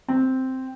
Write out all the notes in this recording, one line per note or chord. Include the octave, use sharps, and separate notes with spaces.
C4